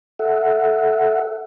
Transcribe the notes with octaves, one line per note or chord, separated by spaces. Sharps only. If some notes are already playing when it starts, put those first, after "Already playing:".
A4 E5 F#5